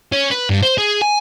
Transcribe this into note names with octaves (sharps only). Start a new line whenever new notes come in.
C#4
B4
G2
C5
G#4
G#5